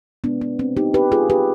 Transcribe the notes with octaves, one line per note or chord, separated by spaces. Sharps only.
B2 G#3 B3 D4
B3
C4
D#4 G4
G4 B4
F4 G#4
G4 B4